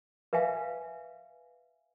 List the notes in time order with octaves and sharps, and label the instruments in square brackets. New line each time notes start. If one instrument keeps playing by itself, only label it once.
[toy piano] B4 E5 F5 G#5